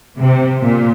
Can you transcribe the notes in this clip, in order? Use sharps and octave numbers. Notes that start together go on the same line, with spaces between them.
C3
A#2